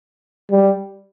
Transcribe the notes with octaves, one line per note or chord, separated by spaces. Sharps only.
G3